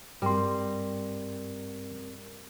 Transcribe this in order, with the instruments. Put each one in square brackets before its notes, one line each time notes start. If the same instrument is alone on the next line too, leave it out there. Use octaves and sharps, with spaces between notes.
[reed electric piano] G2 C6 [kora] G3 [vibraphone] C4 A#4